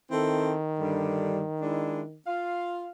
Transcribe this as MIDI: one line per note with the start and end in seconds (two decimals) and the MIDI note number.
0.11 2.18 51
0.11 0.53 60
0.11 0.53 64
0.11 0.53 69
0.78 1.41 43
0.78 1.41 50
0.78 1.41 55
1.61 2.02 56
1.61 2.02 62
1.61 2.02 64
2.27 2.90 65
2.27 2.90 77